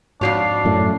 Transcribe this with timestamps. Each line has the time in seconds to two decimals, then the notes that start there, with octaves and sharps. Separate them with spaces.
0.21 F2 G#2 D#3 D4 F#4 C#5 C7
0.65 F#2 A2